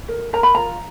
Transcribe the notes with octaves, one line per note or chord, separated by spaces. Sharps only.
A#4
A#4 A#5
B5
F4 A#5